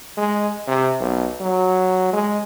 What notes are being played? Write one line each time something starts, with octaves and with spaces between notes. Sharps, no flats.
G#3
C3
B1
F#3
G#3